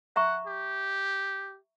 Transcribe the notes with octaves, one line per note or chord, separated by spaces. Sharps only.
E5 F#5 A#5 C#6
G4